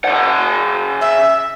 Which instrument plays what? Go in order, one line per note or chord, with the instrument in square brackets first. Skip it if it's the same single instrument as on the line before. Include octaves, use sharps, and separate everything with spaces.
[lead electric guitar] C#3 F#5
[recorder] E5